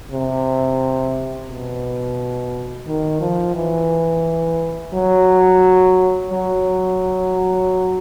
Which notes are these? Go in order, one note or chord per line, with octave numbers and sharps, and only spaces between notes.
C3
B2
D#3
F3
E3
F#3
F#3